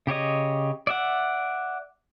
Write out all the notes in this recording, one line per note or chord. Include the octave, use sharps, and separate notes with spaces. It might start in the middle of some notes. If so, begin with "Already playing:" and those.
C#3 G4 C#5 D#5
D5 E5 F#5